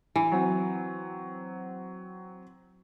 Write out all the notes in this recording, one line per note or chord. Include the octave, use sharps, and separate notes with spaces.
E3
F#3 C4